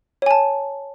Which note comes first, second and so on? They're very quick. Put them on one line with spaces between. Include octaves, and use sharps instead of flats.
C#5 G#5 A5